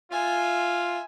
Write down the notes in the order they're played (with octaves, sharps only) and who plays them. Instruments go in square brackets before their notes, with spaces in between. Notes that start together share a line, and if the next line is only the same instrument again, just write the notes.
[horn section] F4 [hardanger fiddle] E5 G#5